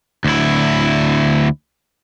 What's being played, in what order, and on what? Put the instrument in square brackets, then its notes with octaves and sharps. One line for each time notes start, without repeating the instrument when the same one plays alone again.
[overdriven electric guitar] D2 E4